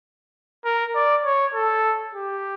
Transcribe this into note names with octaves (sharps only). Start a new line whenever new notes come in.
A#4
D5
C#5
A4
G4